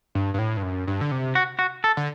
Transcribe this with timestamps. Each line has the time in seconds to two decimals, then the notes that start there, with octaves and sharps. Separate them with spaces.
0.15 G2
0.34 G2
0.39 A2
0.57 G2
0.63 F#2
0.87 G2
1.01 D3
1.11 C3
1.35 F#4
1.59 F#4
1.84 A4
1.97 D3